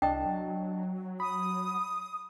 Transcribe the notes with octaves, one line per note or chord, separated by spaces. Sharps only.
C2 D4 D#5 G5 A5
F#3
B5 D#6